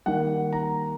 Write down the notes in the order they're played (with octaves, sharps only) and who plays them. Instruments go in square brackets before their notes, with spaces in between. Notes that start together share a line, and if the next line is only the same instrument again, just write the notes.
[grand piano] D#3 G3 A#3 F#5
A#5